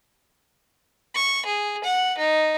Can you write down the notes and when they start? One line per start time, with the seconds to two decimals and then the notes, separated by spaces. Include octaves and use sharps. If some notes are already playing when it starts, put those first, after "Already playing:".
1.15 C#6
1.46 G#4
1.84 F#5
2.18 D#4